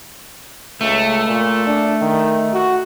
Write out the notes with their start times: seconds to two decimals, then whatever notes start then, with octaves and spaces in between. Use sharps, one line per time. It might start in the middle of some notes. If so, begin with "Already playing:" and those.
0.81 C#2 A3
1.28 A#2
1.67 D4
2.01 D#3
2.53 F#4